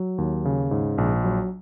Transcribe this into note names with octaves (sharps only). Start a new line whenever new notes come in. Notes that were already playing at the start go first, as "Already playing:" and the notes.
Already playing: F#3
D#2
C#3
G#2
A#1
F#3